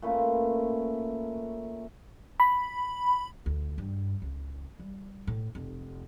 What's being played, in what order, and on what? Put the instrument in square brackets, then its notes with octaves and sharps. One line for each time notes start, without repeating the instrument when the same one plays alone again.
[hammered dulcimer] A#2 A3 C#4 B4
[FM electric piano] B5
[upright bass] D2
G2
C#2
G3
A2
F1